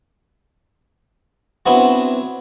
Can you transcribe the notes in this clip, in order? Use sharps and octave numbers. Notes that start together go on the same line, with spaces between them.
F#3 B3 C4 D4 E4 F#4